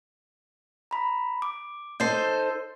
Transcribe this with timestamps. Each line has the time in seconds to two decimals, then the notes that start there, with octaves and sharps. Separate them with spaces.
0.91 A#5 B5
1.42 D6
2.00 D#4 A4 C5 G6